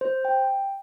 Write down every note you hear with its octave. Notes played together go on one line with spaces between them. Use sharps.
C5
G5